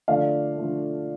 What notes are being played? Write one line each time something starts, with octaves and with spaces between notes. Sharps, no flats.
D3 F3 A3 D5 F5
D3 F3 A3